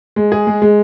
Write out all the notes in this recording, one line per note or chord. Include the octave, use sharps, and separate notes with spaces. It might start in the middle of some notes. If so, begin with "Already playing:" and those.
G#3
G#4
G#3
G#3